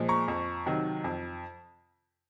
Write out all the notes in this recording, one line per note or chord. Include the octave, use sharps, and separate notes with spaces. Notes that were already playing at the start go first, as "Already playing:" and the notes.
Already playing: A#2 F3 G#3
A#5 C#6
F2
C3 D#3 F#3
F2